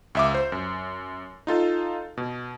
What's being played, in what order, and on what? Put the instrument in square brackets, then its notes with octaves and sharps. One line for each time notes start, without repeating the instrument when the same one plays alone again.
[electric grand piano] C#2 E5 D6
C5
F#2
D#4 F4 A4 F5
B2